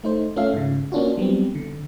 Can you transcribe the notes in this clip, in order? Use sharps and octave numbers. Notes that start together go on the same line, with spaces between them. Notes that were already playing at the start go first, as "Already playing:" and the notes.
A3 D#4 C5
A3 C#4 F4 A4 E5 F5
G#2 C#3
A#3 C#4 D4 F4 F#4
F#3 G3 B3 C4
D3